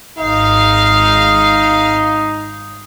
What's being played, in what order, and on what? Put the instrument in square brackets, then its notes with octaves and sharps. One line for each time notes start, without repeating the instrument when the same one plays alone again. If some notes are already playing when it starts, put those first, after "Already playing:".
[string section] G#1 F5 [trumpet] D#4